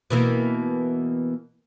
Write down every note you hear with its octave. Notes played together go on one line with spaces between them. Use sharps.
B2 E3 A#3